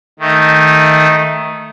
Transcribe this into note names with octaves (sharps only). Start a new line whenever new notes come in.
D#3 A3 D#4